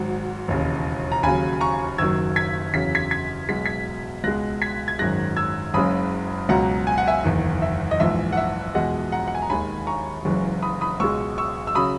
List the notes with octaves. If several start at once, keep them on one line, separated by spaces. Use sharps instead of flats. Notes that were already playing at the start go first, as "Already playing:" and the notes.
Already playing: G#1 G#2 F#3
E1 D#2 C#3
A#5
D#2 C#3 F#3 G#5 B5
A#5 C#6
F#1 F#2 D#3 F#3 E6 G#6
G#6 B6
E2 C#3 F#3 B6
G#6 B6
G#6 B6
B1 B2 G#3 B6
G#6 B6
C#2 B2 G#3 F#6 A#6
G#6 B6
G#6
G#1 F#2 D#3 G#3 F#6 A#6
E6 G#6
F#1 F#2 C#3 G#3 B5 D#6
C#2 B2 F#3 F#5 A#5
G#5
F#5
E5 G#5
F#1 E2 D#3
E5
D#5
A#1 G#2 E3 E5
F#5
E5
E2 B2 G#3 D#5 F#5
F#5 A#5
F#5
G#5
A#5
D#2 D#3 G#3 G#5 B5
A#5 C#6
F#1 F#2 E3 G#3
B5 D#6
B5 D#6
C#2 B2 G#3 C#6 E6
C#6 E6
E6
C#3 F#3 B5 D#6